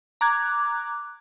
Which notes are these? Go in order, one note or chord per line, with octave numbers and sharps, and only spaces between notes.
A#5 D6 F#6 G#6